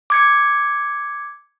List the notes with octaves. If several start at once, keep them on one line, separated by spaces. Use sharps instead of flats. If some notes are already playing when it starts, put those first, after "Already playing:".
D6 G#6 C#7